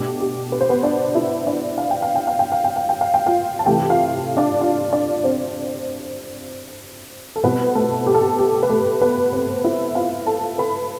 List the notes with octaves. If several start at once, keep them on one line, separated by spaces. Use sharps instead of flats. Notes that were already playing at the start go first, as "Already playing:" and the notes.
Already playing: B2 A3 D4 G4
G4
B4
C5
B3 B4
D4 D5
E4 E5
D4 D5
F5
G5
F5
G5
F5
G5
F5
G5
F5
G5
F5
G5
F4 F5
A5
C3 E3 A3 E4 G4 G5
F4 F5
D4 D5
F4 F5
D4 D5
C4 C5
A4
B2 G3 B3 C4 E4 B4
A3 A4
G4
A4
G4
G4
B4
A3 A4
B3 B4
C4 C5
E4 E5
F4 F5
A4 A5
B4 B5